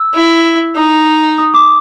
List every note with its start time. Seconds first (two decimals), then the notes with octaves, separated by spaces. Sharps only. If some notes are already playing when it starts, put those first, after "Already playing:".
Already playing: E6
0.14 E4
0.75 D#4 D#6
1.38 D#6
1.54 D6